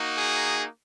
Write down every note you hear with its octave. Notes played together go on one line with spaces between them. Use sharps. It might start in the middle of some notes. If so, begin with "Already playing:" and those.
Already playing: A#3 D#4 F#4
G#4